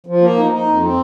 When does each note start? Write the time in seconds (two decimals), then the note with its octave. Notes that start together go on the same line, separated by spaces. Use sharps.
0.06 F3
0.22 A#3
0.37 D#4
0.52 D#4
0.67 F2
0.82 C4